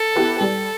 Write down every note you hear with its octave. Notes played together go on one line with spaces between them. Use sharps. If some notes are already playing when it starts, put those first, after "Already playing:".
Already playing: A4
B3 E4 G4 B4
G3 A4